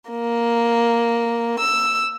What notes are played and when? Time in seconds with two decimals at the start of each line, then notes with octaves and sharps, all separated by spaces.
0.11 A#3
1.60 E6